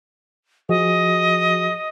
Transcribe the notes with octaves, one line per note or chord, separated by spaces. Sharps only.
F3 F#4 G#4 D#5